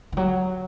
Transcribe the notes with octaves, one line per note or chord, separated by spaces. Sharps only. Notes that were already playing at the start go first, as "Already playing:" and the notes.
D#3
F#3